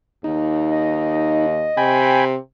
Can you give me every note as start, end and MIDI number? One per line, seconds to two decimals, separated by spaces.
0.24 1.71 39
0.24 1.46 63
0.71 2.06 75
1.77 2.37 48
1.77 2.25 79
1.77 2.25 80
1.77 2.25 83